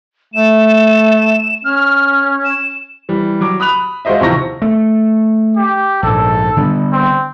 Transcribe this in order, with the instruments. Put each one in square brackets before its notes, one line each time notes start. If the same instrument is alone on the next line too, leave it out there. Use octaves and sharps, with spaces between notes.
[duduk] A3 [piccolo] E7
[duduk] C#4 [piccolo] F6
[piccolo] E7
[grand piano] E3 G3
F#3 D6
B5 D#6 F#6 F7
G#3 F4 F#4 C5 D#5 E5
D#2 C3 E3 F3 C#6 A#6
[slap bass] A3
[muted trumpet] G4
[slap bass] A#1 G#2 [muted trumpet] A4
[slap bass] D3 G3 B3
[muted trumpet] C4